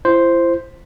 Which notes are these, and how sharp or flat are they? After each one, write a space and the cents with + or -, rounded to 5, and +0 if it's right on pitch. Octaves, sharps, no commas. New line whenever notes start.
E4 +40 C5 +0